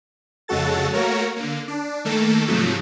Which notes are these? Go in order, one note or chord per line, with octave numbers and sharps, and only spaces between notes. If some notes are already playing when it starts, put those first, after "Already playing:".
F2 C#3 G#3 F#4 A4 A6
A3 A#3 F#4 A#4 C#5
D3 A#3
D4
D#3 A3 A#3 A4
G#2 C3 F3 F#3 A3